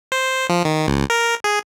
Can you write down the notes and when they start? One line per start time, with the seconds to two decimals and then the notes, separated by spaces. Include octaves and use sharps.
0.12 C5
0.49 F3
0.65 D#3
0.87 C#2
1.10 A#4
1.44 G#4